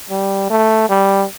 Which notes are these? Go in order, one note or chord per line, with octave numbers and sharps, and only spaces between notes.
G3
A3
G3